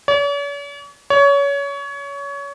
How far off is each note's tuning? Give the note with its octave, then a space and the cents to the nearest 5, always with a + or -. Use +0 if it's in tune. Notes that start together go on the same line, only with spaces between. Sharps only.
C#5 +45
C#5 +25